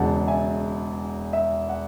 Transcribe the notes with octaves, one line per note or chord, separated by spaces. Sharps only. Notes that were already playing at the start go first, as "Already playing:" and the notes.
Already playing: E1 E2 C#3 F#5 A5
E5 G#5
E5
F#5